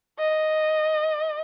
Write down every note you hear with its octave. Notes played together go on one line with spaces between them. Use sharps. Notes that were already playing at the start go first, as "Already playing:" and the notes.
D#5